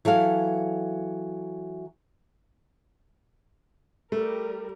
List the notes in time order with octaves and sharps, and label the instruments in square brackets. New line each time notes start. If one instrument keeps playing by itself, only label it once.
[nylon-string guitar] E3 F#3 A4 F5
[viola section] G3 A#4 [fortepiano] A3